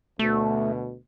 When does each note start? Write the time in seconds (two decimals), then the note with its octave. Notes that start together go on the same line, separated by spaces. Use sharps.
0.19 D2 B2 A3